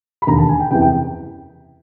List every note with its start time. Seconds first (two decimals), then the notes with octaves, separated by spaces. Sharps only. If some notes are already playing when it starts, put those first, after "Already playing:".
0.22 B5
0.27 E1 D#2 D3 A#5
0.39 A5
0.49 G#5
0.60 G5
0.71 F#1 E2 C3 E3 G5
0.82 G5